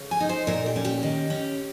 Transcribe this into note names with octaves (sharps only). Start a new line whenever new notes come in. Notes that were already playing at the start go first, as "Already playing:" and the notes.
Already playing: C#3
G#5
D#4
C5
A#2 A#4
G4
C#4
G4
D#3
C#4